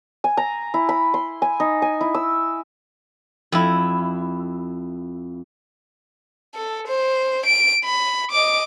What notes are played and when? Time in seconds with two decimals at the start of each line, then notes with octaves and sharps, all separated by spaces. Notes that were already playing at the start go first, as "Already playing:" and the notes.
0.24 G#5
0.37 A#5
0.74 E4
0.89 B5
1.14 C6
1.42 G#5
1.60 D#4
1.82 G#5
2.01 E4
2.15 E6
3.52 F2 E4
6.55 A4
6.88 C5
7.46 D7
7.84 B5
8.31 D#5 D6